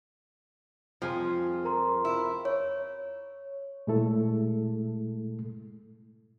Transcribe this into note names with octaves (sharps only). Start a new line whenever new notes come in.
F2 F3 C4 G#4
A#4 A#5 C6
E4
C#5
A#2 G#3 A3 E4 A4